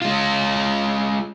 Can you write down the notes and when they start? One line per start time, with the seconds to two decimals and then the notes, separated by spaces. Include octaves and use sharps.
0.02 G#3 F4